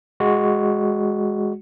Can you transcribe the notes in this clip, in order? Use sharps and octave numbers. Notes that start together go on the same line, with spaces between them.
G#3 F#4